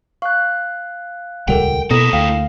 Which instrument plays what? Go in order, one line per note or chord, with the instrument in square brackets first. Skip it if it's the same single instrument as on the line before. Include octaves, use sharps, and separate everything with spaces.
[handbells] F5 F#6 [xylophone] C#6
[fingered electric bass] D#1 C#2 G3 [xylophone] A4 A#4 F#5 [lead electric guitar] G5
[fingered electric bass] B2 [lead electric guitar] A#3 E4 [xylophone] A4 [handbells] D#6 A#6
[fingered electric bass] D2 [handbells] F5 [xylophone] G5